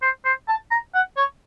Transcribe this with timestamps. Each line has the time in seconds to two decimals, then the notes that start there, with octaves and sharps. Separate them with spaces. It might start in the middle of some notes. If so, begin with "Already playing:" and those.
0.02 C5
0.25 C5
0.48 A5
0.71 A#5
0.94 F#5
1.17 C#5